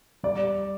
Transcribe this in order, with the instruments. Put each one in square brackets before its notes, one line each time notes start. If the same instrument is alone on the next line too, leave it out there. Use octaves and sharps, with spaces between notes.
[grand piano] G3 D5